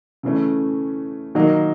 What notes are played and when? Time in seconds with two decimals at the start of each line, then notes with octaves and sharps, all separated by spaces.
0.23 C#3 E3 A3 C#4
1.35 D#3 F#3 A#3 D#4